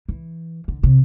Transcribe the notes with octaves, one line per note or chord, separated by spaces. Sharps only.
E3
D3
C3